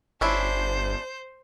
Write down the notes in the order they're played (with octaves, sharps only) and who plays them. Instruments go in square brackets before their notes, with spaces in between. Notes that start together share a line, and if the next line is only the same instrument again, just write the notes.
[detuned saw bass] G1 [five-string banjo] C#4 D4 E4 [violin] C5 G6